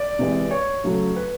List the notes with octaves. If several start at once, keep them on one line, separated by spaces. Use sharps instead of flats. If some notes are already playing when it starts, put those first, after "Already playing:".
Already playing: D5
C3 E3 G#3
C#5
C#3 F#3 A3
B4